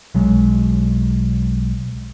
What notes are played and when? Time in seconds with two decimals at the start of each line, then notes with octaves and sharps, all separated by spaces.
0.15 B1 F#3 G#3